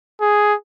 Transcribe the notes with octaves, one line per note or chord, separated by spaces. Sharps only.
G#4